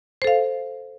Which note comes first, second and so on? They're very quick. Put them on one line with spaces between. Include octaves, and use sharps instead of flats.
C5 A4 F5